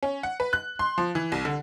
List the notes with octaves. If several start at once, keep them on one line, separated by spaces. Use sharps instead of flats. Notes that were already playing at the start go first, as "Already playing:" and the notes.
C#4
F#5
B4
F#6
C6
F3
E3
C2
D3